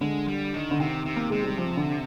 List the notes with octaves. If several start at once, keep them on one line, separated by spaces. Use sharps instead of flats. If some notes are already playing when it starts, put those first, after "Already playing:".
D3 G#3
G3
D#3
D3
C3 D#3
C3
A#3
C3 G#3
G3
F3
D3